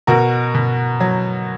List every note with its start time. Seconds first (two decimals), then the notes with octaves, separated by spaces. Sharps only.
0.07 B2 F#4 A#4
0.54 B2
1.00 F#3